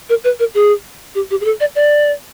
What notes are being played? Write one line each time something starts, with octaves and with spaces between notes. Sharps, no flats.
A#4
B4
A#4
G#4
G4
G4
G#4
A4
D5
D5